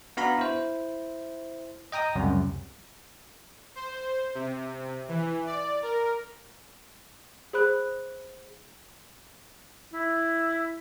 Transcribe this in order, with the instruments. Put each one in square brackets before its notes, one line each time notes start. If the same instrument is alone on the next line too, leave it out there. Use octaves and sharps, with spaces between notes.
[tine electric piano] B3 D4 F#4 F5 A#5 B5
E4 C5
D#5 G5 A#5 D#6
C#2 F#2 C3 G3
[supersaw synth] C5
C3
E3
D5
A#4
[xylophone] G#4 C5 B5 F#6
[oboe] E4